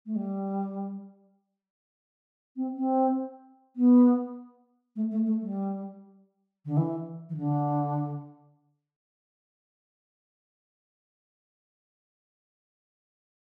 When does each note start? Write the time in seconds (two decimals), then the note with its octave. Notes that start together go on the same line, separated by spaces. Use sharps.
0.06 A3
0.16 G3
2.56 C4
2.76 C4
3.76 B3
4.96 A3
5.11 A3
5.26 A3
5.41 G3
6.65 D3
6.77 E3
7.29 E3
7.37 D3